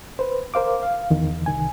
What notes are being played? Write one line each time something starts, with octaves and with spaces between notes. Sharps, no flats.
B4 C5
A#4 C5 F5 D6
F5
E2 D#3
C2 D#3 G#5